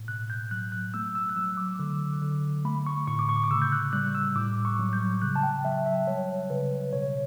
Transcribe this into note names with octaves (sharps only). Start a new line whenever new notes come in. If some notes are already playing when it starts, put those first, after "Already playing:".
Already playing: A2
B2 F#6
G6
F#3 F#6
F#6
A3 E6
E6
F#6
F#3 E6
D6
D3
D3
A3 B5
C#6
A2 C#6
D6
C#6
D6
C#3 E6
G6
F#6
G3 F#6
E6
A2 D6
C#6
F#3
G6
C#3 F#6
A5
G5
F#3 E5
E5
G3 C#5
C#3 B4
B2 C#5